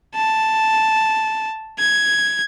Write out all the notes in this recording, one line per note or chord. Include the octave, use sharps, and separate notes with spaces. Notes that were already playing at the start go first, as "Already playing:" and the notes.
A5
G#6